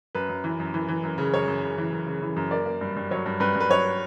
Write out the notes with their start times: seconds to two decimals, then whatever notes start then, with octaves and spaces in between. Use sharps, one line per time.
0.15 F#2 B4
0.29 F#2
0.44 E3
0.60 F#2
0.74 E3
0.88 E3
1.03 F#2
1.18 C#3
1.33 F#2 C#5
1.48 F#2
1.63 C#3
1.78 E3
1.93 F#2
2.07 C#3
2.22 E3
2.36 F#2
2.51 A#3 D5
2.66 A#3
2.81 G2
2.97 G2
3.11 F#3 C#5
3.26 G2
3.40 G2 B4
3.56 G2 B4
3.69 F#3 C#5